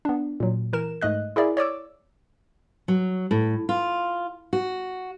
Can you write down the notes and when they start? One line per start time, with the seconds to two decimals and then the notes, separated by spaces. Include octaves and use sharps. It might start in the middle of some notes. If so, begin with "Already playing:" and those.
0.05 B3 D4
0.40 A#2 F#3
0.73 E3 A#4 E7
1.01 G#2 A3 D#5 F#6
1.36 E4 G#4 A#4 D5 E5
1.57 C#5 D5 D6 E6
2.88 F#3
3.31 A2
3.69 F4
4.53 F#4